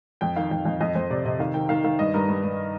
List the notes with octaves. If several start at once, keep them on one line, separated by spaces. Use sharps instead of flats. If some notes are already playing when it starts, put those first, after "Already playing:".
F2 G5
D#3 F5
F2 G5
F2 D#5
F2 D#5
F2 C5
C3 D5
C3 D#5
D#3 F5
D#3 G5
D#3 F5
D#3 F5
G2 D#5
G2 A#4
G2
G2